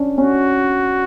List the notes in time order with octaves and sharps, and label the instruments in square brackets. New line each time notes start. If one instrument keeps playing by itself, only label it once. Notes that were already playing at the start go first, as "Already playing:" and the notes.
Already playing: [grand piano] C#4 D4
[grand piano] C#4 [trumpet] F#4